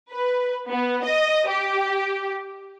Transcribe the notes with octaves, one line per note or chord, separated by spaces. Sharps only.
B4
B3
D#5
G4